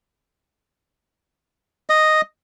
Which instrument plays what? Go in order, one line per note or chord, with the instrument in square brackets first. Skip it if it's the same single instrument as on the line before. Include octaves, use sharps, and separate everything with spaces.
[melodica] D#5